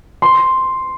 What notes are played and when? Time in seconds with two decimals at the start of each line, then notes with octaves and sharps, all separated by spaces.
0.22 C6